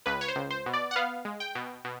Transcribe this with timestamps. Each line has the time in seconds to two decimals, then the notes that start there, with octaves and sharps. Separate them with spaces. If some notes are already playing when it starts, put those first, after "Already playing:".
0.06 C#2 B4
0.21 C#5
0.28 C5
0.36 C#2
0.51 C5
0.66 B2
0.73 D5
0.91 F#5
0.96 B3 F5
1.25 G#3
1.40 G5
1.55 B2
1.85 B2